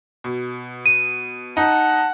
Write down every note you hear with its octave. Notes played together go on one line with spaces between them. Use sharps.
B2
D#7
D#4 F#5 A5